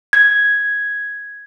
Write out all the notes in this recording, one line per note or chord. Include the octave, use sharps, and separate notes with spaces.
G#6